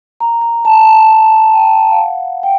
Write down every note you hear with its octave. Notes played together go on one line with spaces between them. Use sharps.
A#5
A#5
A5
A#5
A5
A#5
A5
A#5
A5
G5
F5
F#5
G5